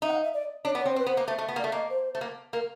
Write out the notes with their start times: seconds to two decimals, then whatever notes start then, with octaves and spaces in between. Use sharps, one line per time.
0.02 D#4 E5
0.08 F#5
0.12 F5
0.23 E5
0.34 D5
0.65 D4 C#5
0.75 B3
0.80 C#5
0.85 C4
0.89 C5
0.96 C4 B4
1.06 B3 C5
1.17 A#3
1.28 A3
1.38 A3
1.48 B3
1.56 A#3 D5
1.64 A3
1.72 A#3 D#5
1.90 C5
2.15 A3
2.21 A#3
2.53 A#3 A#4